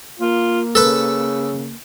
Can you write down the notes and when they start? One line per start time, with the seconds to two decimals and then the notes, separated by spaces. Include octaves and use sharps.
0.19 A#3 F4
0.75 C#3 A4 B4